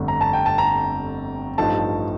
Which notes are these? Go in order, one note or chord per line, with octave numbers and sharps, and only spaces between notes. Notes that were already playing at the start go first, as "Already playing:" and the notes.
Already playing: G1 F2 D3 A3
A#5
A5
G5
A5
A#5
A1 G2 F3 A3 D#4 A5